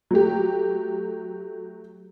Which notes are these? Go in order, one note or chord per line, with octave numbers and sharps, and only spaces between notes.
F#3 A3 G4